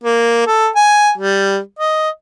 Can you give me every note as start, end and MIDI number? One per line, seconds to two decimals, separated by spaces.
0.04 0.44 58
0.47 0.68 69
0.76 1.11 80
1.18 1.59 55
1.79 2.09 75